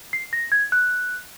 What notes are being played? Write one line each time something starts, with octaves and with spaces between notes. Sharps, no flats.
C7
A#6
G#6
F#6